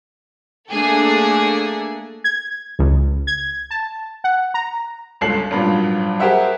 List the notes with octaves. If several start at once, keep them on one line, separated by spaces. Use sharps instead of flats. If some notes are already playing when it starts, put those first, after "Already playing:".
A3 A#3 D4 G#4 A4
G#6
C#2
G#6
A5
F#5
A#5
G1 C#2 A4 C7 F#7
G#1 G2 A#2 F#3
G4 G#4 A#4 C5 E5 F#5